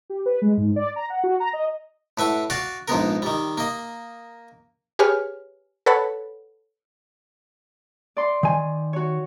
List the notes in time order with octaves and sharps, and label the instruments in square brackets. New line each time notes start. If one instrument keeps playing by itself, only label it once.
[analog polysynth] G4
B4
G#3
G#2
D5
A#5
F#5
F#4
A#5
D#5
[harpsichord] A2 B4 E5 F#5
F#4 D5 F5
A#1 G#2 B3 A#4
D#3 G3
A#3 D#5
[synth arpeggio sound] G4 G#4 B4 C#5 G#5 F6
A4 B4 C#5 F#5 A5 B5
[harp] D5 C6
[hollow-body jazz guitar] D#3 G#5
[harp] F#4 C#5